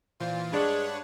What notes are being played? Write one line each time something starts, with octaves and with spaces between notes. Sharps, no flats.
A#2 E3 F4 C5
G2 G#3 D4 B4 C#5 F#5